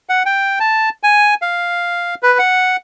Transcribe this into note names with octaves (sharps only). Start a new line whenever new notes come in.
F#5
G5
A5
G#5
F5
B4
F#5